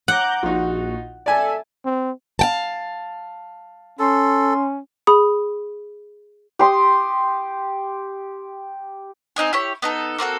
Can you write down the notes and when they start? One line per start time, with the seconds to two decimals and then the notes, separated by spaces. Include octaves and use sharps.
0.08 F#5 A#5 D6 G6
0.43 A#1 D#4 F4 F#4
1.26 A4 D5 E5 G#5
1.85 C4
2.39 F5 G5 A5
3.99 C#4 A4 C6
5.07 G#4 B5 D#6
6.59 G4 C6 D#6
9.36 C4 D#4 D#5 G#5
9.53 E4 G4 C#5
9.82 B3 D#4 A4
10.19 A#3 C4 F#4 A4